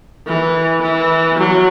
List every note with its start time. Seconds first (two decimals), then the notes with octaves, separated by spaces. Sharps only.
0.27 E3
0.82 E3
1.38 F#3